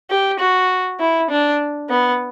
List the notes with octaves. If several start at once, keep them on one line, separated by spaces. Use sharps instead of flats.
G4
F#4
E4
D4
B3